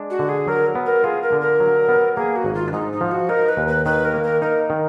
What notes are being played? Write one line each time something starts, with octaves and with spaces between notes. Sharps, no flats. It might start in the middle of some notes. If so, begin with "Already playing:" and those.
Already playing: G#3 D4
F#4
D3
G#4
F#3 A#4
B3
A#4
F4 G#4
A#4
D3
A#4
F#3
B3
A#3 G#4
F#4
G#1
F4
D4
G#2 D#4
D#4
F3
F#4
D#4 A#4
B4
D#2
B4
D#3 B4
A#4
A#3
A#4
D#4 A#4
D#3